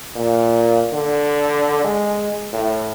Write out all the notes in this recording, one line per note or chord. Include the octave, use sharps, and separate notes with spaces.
A#2
D3
G#3
A2